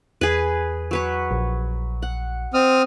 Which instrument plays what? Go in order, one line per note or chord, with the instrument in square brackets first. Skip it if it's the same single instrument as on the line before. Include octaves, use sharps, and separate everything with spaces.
[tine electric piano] E2 [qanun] G#4 B4
[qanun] F#3 B4 C#5
[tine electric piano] A#1
[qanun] F#5
[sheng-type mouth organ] C4 D#6 F6 [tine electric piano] D#5 C6